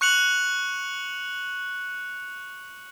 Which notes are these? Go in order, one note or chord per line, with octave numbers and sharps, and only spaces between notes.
C#6 F#6 C#7 F7 F#7